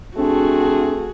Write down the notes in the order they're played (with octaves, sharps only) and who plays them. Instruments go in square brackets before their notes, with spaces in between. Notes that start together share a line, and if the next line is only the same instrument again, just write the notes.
[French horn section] C3 A3 C4 [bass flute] D4 [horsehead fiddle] F#4 G#4